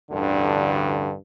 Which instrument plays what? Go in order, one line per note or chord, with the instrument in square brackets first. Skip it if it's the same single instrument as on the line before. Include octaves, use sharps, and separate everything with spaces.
[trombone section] A1 D2 G2 D3